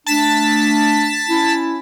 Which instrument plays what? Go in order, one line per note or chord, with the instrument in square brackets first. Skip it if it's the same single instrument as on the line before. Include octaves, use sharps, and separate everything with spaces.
[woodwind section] A3 D4 [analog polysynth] A5 A6 B6
[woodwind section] C#4 E4